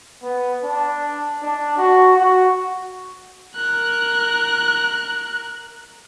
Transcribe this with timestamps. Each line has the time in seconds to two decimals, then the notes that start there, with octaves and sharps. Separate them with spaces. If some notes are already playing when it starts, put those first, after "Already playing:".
0.23 B3
0.64 D4
1.43 D4
1.78 F#4
2.17 F#4
3.55 A#4 F#6